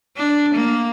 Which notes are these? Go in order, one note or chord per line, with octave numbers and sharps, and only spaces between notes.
D4
A#3